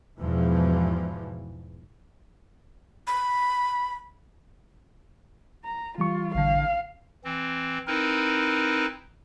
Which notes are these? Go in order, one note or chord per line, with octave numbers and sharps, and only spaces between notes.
E2 G#2 B2 E3 F3
B5
A#5
E3 G3 F4 C#6
A1 D3 F5
E3 C4
C4 D#4 E4 A#4 B4